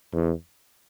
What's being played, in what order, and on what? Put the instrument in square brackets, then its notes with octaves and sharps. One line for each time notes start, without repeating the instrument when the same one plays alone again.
[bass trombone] E2